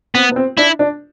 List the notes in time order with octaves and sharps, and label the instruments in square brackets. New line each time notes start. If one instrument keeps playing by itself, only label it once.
[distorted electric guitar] B3 [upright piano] C4
[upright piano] B3
C4
[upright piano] D4 [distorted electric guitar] E4
[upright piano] D4